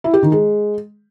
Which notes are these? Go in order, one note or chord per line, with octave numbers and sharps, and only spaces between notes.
E4
G4
D#3
G#3